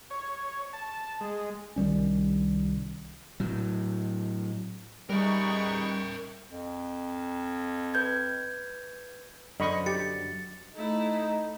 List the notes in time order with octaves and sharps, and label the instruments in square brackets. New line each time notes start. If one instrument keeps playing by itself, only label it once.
[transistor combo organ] C#5
A5
G#3
[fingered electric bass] C2 D#3 G3 C#4
[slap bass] A2 F#3
[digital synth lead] G3 [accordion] D#4 G#4 B4 [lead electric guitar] A#4 E5 [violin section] G5 C#6
[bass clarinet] F2
[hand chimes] B4 G6 G#6
[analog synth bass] F#2 [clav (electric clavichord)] D3 C5 [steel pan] D#5 B5 C#6
[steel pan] G4 [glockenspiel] A6 C#7
[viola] A3 E4 [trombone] D#4